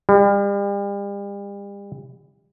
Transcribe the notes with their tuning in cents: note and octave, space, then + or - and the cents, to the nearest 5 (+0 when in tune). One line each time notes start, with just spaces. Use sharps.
G3 +40